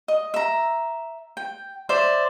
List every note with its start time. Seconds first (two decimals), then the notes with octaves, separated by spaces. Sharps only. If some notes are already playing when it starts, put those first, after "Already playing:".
0.08 D#5
0.34 E5 A#5
1.37 G5
1.89 C5 D5 E5